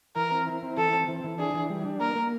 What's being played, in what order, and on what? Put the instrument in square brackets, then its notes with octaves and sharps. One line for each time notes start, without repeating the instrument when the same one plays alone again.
[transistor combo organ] E3 [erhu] A#4
[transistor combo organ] C4
E4
C4
[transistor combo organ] E3 [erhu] A4
[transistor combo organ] C4
E3
E3
[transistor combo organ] D4 [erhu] G#4
[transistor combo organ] E3
G3
D4
[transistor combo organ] A#3 [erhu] A#4
[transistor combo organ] A#3